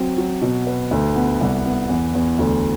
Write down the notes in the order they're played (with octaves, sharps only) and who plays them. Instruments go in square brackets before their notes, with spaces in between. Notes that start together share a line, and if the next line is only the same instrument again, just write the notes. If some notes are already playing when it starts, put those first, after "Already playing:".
Already playing: [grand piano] F#3 C4
F#3
B2
B4
D2
B3
C2
B3
E2
E2
D2